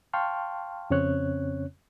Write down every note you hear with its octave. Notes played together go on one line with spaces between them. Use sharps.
F5 G5 A5 C6 C#6 F6
F2 C#3 C4 C#4 C#5 F#6